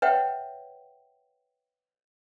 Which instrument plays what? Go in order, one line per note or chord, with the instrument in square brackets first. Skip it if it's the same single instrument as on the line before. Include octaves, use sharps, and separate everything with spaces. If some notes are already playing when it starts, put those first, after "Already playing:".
[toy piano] B4 C#5 E5 F#5 G5